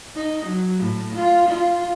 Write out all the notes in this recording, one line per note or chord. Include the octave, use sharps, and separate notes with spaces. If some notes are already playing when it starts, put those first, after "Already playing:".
D#4
F#3
A2
F4
F4